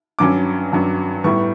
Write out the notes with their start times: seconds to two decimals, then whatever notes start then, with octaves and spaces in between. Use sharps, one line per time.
0.19 G2 F#3 C#4 D6
0.72 G2 F#3 C#4
1.24 A2 G3 B3 C#6